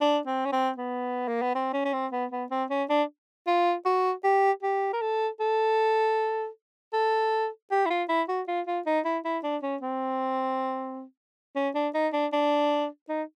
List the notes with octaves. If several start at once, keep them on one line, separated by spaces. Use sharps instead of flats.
D4
C4
C#4
C4
B3
A#3
B3
C4
C#4
C#4
C4
B3
B3
C4
C#4
D4
F4
F#4
G4
G4
A#4
A4
A4
A4
G4
E4
F4
E4
F#4
F4
F4
D#4
E4
E4
D4
C#4
C4
C#4
D4
D#4
D4
D4
D#4